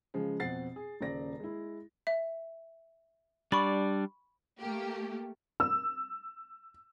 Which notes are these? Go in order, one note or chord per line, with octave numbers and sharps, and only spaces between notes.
C#3 F3 G#3
F2 B2 C4 F#5 A6 C7
G#4
D#1 C#3 C5 D5 A#6
G#3 E4
E5
G3 D4 D5 B5 C#6
A3 A#3 G4
E6